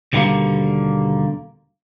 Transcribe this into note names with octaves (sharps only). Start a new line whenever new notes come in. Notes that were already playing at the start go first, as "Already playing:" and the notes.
D#2 B2 D3 G3 A3 A#3